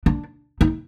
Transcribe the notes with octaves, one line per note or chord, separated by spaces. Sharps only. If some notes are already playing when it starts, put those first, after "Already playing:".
D4
D#4